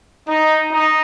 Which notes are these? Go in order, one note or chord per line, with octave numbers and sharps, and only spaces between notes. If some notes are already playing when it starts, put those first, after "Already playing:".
D#4
D#4